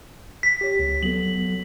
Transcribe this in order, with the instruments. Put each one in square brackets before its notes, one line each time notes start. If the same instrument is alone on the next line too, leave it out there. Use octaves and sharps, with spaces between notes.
[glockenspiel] B6
[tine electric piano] G4 C#5
C#2
[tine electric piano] F#3 B3 A4 [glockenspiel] F#7